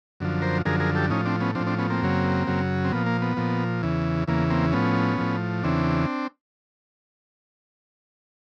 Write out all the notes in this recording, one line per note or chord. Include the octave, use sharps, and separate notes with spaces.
F#2 D3 F3
A#4 C5
F#2 D3 F3 G#4 A#4
G#4 A#4
G4 A4
A2 F3 C#4 D#4
C4 D4
B3 C#4
A2 F3 C4 D4
C4 D4
B3 C#4
A#3 C4
F#2 C#3 F#3
F#2 C#3 F#3
C4
A#2 F3 B3
A#3
B3
A#2 F3
E2 C#3 E3
E2 C#3 E3 A#3
A#3 C4
A2 F3 B3 C#4
A2 F3
E2 C#3 E3 C4 D4